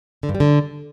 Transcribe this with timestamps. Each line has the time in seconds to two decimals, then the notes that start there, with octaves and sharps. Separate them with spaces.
0.23 D3
0.29 G2
0.35 G3
0.40 D3